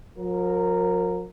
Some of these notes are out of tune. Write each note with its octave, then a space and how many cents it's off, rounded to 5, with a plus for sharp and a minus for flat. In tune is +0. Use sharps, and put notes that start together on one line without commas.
F3 +45 A#4 -10